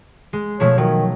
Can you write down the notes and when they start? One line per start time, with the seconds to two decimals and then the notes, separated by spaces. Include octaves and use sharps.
0.33 G#3
0.60 B2 F3 A3 C#5
0.78 D#3 F#3